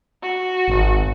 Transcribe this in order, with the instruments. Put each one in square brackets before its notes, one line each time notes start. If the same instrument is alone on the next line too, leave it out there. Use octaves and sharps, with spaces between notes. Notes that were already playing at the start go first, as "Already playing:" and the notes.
[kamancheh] F#4
[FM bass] G#1